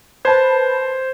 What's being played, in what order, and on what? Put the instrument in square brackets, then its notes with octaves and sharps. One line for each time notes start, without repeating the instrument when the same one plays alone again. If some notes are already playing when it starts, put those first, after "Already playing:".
[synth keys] B4 A5 [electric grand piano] C5 G#6